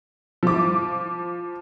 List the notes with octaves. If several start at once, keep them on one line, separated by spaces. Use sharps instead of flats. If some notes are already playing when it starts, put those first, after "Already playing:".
F3 D6